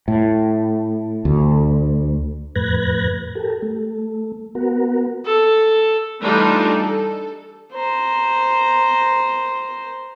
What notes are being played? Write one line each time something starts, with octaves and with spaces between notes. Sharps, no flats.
A2
D2
F2 A2 B4 F#6 G#6 A#6
G4 A4 A#4
A3
B3 F#4 A#4
A4
E3 G3 A3 D4 D#4 F4
A4
C5 A#5